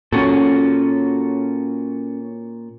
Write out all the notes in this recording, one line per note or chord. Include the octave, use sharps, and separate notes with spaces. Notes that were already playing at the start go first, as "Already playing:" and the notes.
A#2 C#4 F#4 A4